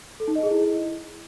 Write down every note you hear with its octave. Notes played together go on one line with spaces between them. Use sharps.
A4
D#4
D#5
G#4
E4